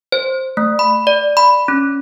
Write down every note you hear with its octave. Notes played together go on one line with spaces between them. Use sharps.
C5
A3
B5
D5
B5
C#4